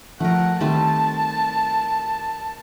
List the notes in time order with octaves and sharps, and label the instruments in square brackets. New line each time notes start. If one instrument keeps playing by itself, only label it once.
[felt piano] F3 [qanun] A3 A#4 [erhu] F#5
[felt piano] D#3 [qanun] G3 A3 C4 [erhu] A5